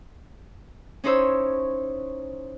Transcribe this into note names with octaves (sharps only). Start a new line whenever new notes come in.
C#4 D#4 E4 C5 C#5 E6